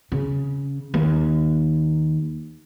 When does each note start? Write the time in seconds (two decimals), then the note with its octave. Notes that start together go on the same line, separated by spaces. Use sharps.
0.12 C#3
0.94 D#2